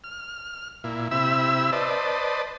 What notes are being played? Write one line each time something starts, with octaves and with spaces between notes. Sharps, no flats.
F6
A#2 E4
C3 E4 E5 B5 E6
B4 C5 D5 D#5 A5